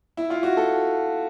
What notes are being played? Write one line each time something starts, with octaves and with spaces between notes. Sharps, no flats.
E4
F4
F#4
A4